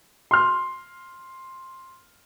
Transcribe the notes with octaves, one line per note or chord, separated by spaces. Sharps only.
C6 F6